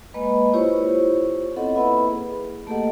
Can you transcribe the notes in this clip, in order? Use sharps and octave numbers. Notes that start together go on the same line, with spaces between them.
G#3 A#3 B4 D#5 B5
E4 F4 G4 C5 C#5 C#6
B3 C4 A4 D#5 F#5
A#3 E4 B4 E5 B5
G#4
A3 A#3 G4 A4 D#5 F#5